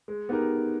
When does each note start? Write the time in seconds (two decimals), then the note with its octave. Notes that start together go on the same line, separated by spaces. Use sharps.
0.08 G#3
0.29 B3 D#4 G4 A#4